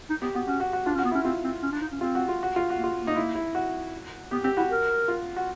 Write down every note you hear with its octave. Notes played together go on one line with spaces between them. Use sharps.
D#4
B3 G4
B3 F#4
C#4 F#4
F#4
F#4
D4 F4
C#4
F#4
B3
C#4 E4
C4 F4
C4
C#4
D4
D#4
C#4
C4 F4
F#4
F4
F#4
F4
F#4
A#3
F4
A#3
D#4
E4
E4
F#4
B3 G4
C4 G4
E4 F#4
A#4
F4
F#4